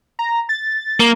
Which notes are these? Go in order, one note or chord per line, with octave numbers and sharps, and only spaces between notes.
A#5
A6
A#3